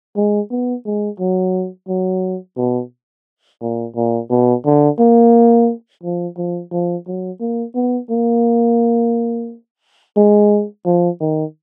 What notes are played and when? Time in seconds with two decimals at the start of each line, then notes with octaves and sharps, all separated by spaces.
0.16 G#3
0.51 B3
0.85 G#3
1.20 F#3
1.88 F#3
2.57 B2
3.62 A#2
3.96 A#2
4.30 B2
4.65 D3
4.99 A#3
6.03 F3
6.37 F3
6.72 F3
7.07 F#3
7.40 A#3
7.75 B3
8.10 A#3
10.17 G#3
10.86 F3
11.20 D#3